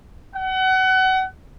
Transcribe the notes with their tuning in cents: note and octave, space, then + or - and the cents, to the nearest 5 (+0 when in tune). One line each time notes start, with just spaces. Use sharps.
F#5 +30